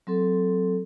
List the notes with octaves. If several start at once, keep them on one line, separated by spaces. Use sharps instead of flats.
F#3 C4 A4